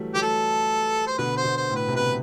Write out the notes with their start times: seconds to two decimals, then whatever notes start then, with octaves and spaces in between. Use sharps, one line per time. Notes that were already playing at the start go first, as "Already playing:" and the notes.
Already playing: E3 F#3 G3 A3
0.15 F#3 A3 G4
0.22 A4
1.07 C5
1.18 B2 D3 B4
1.37 C5
1.44 B2
1.57 C5
1.70 A2
1.76 B4
1.88 C3
1.95 B2 B4